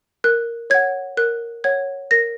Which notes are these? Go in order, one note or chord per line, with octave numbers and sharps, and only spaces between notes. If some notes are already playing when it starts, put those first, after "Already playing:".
A#4 F#6
C#5 F#5 G#6
A#4 F#6
C#5 F#5 G#6
A#4 A#6